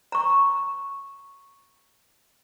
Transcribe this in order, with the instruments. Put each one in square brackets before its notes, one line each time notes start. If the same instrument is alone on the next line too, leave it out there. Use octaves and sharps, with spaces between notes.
[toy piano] A#5 C#6